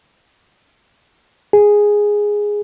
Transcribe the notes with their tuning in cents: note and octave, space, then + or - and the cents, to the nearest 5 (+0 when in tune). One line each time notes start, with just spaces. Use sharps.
G#4 -5